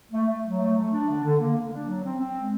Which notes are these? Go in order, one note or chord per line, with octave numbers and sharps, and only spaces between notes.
A3
A3
F#3
A3
A3
D4
D3
D3
A#3
A#3
D4
F#3
C4
C4
G#3